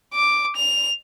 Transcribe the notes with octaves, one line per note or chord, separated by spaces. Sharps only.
D6
F7